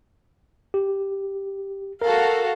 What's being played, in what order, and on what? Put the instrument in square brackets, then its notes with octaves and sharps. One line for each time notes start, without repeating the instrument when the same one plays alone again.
[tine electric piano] G4
[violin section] F#4 A4 F5 [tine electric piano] A#4